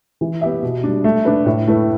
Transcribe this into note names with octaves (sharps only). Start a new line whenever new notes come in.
E3
B3 G4 E5
B2
G3 D4
A3
D4 B4
A2
A3 E4 B4